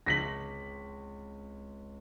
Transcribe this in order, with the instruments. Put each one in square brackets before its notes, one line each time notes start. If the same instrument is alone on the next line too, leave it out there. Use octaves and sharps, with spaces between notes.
[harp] C#2 C4 D6 [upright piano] A#6 B6 F#7